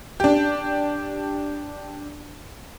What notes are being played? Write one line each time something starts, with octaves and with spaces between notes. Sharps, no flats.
D4 G4